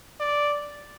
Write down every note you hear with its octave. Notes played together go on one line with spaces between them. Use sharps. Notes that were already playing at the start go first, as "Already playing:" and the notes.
D5